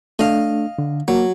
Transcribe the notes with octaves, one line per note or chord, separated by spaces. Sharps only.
A3 D4 D#5 F5
D3
F#3 A#3